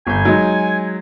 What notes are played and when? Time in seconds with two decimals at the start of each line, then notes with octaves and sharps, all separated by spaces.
0.07 G1 G#5 G6
0.25 F#3 G#3 D#4